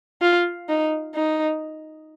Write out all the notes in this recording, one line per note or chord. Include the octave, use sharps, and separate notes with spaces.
F4
D#4
D#4